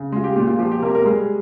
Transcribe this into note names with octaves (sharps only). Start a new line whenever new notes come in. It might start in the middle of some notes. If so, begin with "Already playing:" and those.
Already playing: C#3
G#3 F4
G4
A#2 G4
F4
F3 G4
G4
C3 A#3 A#4
A#3 A#4
G3 G#3 G#4